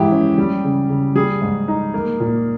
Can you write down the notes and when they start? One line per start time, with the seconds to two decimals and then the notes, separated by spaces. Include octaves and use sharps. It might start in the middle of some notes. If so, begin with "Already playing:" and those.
Already playing: G#2 E3 E4 G4
0.11 C#4
0.38 G3
0.64 C#3
0.89 C#3
1.15 G3 G#4
1.42 G#2
1.68 D#4
1.94 A#3
2.20 A#2